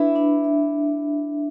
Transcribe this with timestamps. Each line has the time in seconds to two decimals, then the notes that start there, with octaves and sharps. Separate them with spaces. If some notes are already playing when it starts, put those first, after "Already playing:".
Already playing: D4 E4 B4
0.15 D4
0.44 E5